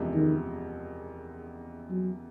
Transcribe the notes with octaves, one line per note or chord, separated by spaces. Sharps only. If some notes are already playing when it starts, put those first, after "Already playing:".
Already playing: F#1 E2 C3 F3 G#3
D#3
F#3